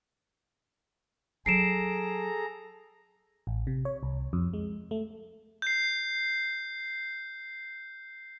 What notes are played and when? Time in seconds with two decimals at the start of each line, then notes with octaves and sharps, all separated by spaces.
1.46 F#3 G#4 A4 A#5 C7 D7 E7
3.47 A1
3.67 C3
3.85 C#5
4.03 C2
4.33 F2
4.53 G#3
4.91 A3
5.62 G6 C7